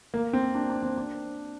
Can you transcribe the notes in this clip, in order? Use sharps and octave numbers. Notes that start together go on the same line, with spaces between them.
A#3
C4
D4
D4
C4
D4